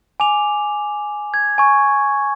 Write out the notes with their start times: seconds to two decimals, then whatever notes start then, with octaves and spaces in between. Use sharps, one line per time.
0.20 G#5 D6 F7
1.34 G#6
1.58 G#5 C#6